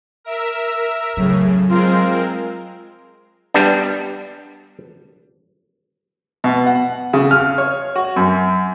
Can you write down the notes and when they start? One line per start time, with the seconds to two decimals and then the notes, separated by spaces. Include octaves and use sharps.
0.24 A#4 E5 E6
1.17 A2 C#3 F#3
1.69 G#3 C4 F4 A#4
3.54 G3 B3 D4
6.44 B2
6.66 F#5
7.13 C#3
7.31 F6
7.58 C#5
7.96 F#4
8.16 F#2